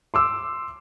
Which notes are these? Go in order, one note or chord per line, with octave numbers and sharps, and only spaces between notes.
C6 D6 E6